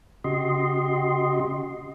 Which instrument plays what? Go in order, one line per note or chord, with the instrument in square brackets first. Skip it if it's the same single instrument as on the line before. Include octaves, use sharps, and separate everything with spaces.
[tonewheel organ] C#3 F#4 G4 D#5 C6